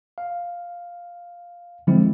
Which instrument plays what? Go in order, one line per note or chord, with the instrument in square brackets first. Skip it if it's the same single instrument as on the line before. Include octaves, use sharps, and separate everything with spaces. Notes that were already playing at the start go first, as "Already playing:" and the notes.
[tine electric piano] F5
D3 F3 F#3 G#3 C4 E4